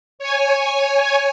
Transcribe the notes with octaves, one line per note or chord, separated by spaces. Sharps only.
C#5 G#5